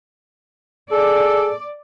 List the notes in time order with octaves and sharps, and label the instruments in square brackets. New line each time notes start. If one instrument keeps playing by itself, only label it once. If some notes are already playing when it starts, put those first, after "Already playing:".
[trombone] G#4 [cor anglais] A4 [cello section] D5